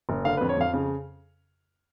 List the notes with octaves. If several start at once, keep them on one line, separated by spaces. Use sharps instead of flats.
F#1
D3 F5
B4
F2
C#5
F2 F5
C#3